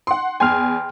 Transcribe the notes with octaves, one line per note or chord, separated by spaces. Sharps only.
F#5 C6
E2 G5 G#5 C6 F6